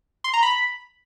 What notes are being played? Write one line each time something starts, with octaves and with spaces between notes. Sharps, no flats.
C6
A#5
B5